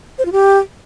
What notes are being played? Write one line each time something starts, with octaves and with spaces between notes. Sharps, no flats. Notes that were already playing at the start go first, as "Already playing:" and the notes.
C5
F4
G4